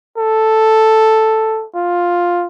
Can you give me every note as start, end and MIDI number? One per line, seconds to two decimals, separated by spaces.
0.17 1.65 69
1.74 2.47 65